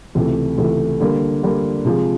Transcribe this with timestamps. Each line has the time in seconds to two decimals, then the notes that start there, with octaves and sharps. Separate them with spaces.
0.15 C#2 C3 E3 A3
0.58 C#2 C3 E3 A3
1.00 D3 G3 A#3
1.43 D3 G3 A#3
1.85 C3 F3 G#3